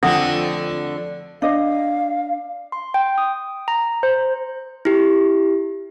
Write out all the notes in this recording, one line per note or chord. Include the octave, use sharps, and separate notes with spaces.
F2 D3 A3 C4 F#5 G5 D#6 A#6
D4 D#5 F5
C6
G5
D#6
A#5
C5
E4 G4